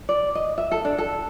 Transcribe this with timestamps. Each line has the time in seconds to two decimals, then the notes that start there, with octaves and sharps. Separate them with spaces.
0.09 D5
0.35 D#5
0.58 E5
0.71 A4
0.85 D4
0.98 A4